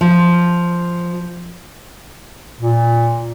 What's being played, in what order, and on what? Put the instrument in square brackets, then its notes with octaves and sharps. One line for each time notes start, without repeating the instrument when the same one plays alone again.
[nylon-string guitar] F3
[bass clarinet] A#2